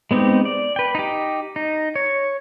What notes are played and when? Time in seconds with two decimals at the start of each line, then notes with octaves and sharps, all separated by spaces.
0.11 G#3 B3 C4 D#4 G4
0.45 D5
0.76 B4 G5
0.95 D#4 G4
1.56 D#4
1.95 C#5